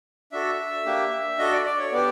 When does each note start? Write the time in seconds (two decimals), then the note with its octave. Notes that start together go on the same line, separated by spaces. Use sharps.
0.32 D4 F#4 A4 E5
0.86 A#3 D4 G4
1.38 D4 F#4 A4 D#5
1.52 D5
1.65 D5
1.79 C#5
1.92 B3 D4 G4 D5